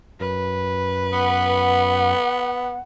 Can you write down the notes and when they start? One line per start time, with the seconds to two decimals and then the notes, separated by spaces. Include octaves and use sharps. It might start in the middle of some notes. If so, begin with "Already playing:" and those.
0.20 F#2 B4
1.12 B3 F#5